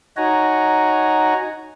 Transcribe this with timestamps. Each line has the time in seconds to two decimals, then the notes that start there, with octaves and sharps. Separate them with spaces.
0.17 D#4 F#4 C#5 F#5 G#5 A#5